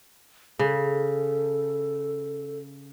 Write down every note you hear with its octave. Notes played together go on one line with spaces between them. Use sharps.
C#3 A4